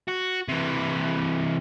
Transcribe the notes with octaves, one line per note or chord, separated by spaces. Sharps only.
F#4
C3 E3